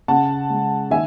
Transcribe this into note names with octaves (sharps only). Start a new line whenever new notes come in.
C#3 F#5 A5
G#3
D#3 E5 G#5